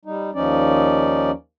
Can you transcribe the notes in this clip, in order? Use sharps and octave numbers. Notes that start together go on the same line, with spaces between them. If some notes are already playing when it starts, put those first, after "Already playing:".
G3 D#4
D#2 F3 C#4 D#4 D5